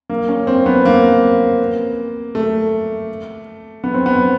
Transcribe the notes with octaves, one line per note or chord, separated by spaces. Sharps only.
A#3
C#4
C4
B3
A#3
A3
B3
C4
B3